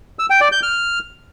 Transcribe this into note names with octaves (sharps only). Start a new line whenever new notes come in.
E6
G5
D5
G6
F6